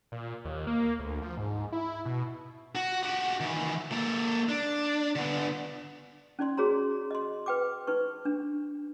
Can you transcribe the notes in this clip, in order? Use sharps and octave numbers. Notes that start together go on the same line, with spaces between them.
A#2
D#2
A#3
D2
F3
G#2
E4
B2
F#4
F#4 G4
D#3 E3
A#3 A4
D4
D3 B3
C#4 D#4 D5 C6
F#4 G#4 C#5 A#5 C6
D#5 C6
B4 G5 D6
D#4 B4 C#6
D4